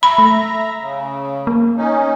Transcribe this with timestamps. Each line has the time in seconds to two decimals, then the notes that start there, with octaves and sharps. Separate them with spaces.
0.03 E5 A#5 B5
0.18 A3
0.81 C#3
1.47 A#3
1.77 C#4 D#4